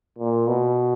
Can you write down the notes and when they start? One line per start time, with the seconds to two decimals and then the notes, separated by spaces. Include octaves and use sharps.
0.19 A#2
0.48 B2